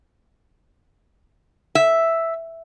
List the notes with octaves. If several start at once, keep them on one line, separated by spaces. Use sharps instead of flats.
E5